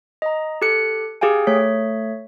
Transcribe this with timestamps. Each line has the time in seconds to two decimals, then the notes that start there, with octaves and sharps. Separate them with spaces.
0.22 D#5 A#5
0.62 G4 A4 F#6 C#7
1.21 G4 G#4 F5 G5 G#5
1.47 A3 C#5 B6